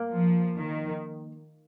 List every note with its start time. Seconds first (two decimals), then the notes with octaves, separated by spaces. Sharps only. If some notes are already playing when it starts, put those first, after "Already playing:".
Already playing: A#3
0.14 F3
0.59 D#3